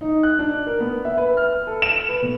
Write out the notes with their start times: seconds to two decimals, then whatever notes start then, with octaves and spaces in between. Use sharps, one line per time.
0.01 D#4
0.23 F#6
0.39 D4
0.67 A#4
0.80 B3
1.05 E5
1.18 B4
1.37 F6
1.67 A4
1.82 E7
2.09 B4
2.22 B2